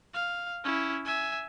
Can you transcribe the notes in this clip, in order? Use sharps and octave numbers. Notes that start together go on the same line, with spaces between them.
F5
C#4 E4
E5 G#5